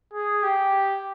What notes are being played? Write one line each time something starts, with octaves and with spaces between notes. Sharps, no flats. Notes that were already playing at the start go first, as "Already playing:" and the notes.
G#4
G4